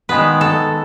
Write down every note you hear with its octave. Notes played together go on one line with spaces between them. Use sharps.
D#3 G#3 B3 B4
A4